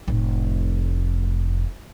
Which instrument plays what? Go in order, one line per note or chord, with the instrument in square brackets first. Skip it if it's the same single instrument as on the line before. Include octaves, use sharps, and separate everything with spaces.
[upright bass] F1 A2